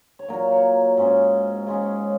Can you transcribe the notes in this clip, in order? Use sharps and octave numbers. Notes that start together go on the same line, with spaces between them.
C#5
A#2 F#3 A#3 A#4
C#5
G#2 G#3 C#4
C#3 G#3 C#4